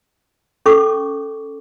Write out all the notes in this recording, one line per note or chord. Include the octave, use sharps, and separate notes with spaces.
C#4 A4 C#6 D6